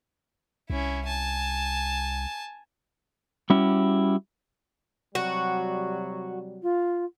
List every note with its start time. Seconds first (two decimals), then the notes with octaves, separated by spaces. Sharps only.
0.70 C2 C#4 E4
1.06 G#5 A5
3.50 G3 C#4 E4 F#4 G4
5.15 C3 F#3 G3 F#4
6.62 F4